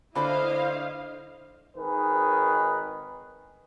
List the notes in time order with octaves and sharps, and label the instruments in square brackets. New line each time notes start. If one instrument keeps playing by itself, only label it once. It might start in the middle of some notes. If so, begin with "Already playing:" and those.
[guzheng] D3 [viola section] E4 D#5 F5 [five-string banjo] B4 A5 B5 [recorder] C5
[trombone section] G#1 D#3 G#4 B4